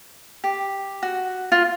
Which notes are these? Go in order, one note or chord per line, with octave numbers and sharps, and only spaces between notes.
G4
F#4
F4